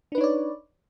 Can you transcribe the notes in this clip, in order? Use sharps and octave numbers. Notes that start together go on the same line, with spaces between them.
D4 D#4 B4 C#5 D5